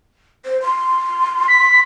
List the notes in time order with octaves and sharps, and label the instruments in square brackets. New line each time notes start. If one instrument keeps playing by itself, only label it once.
[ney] C5
C6
[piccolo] B6